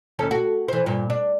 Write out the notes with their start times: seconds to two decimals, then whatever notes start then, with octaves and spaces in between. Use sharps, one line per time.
0.19 D#2 C#4 A4
0.31 F#4
0.68 E3 C5
0.86 G2 A#2
1.10 D4